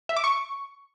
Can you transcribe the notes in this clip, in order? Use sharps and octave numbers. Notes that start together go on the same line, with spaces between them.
E5
D6
C#6